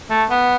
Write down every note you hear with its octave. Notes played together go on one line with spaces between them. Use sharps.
A3
B3